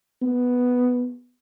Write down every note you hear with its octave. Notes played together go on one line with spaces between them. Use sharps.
B3